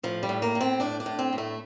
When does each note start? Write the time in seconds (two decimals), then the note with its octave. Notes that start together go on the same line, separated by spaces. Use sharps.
0.03 A2 F3
0.23 G3
0.29 A2
0.42 A#3
0.55 A2
0.61 C4
0.80 A2 D4
1.00 D4
1.06 A2
1.19 C4
1.33 A2
1.38 A3